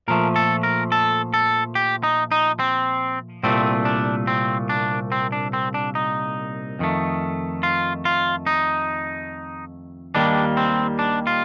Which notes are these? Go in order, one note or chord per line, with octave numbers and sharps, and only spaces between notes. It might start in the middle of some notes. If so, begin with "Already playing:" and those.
A#2 F3 A3 A#4
A4
A#4
A4
A4
G4
D#4
D#4
C4
C2 A#2 A3 C4
D4
C4
D4
C4
D4
C4
D4
D#4
F2 D#3 A3
F4
F4
D#4
D#2 D#3 G3 A#3 D4
C4
D4
F4